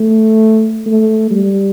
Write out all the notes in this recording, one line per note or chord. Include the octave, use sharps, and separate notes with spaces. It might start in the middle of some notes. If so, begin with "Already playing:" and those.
Already playing: A3
A3
G3